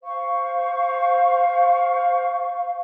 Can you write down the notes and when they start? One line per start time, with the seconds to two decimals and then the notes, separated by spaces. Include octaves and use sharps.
0.03 C5 F5 C#6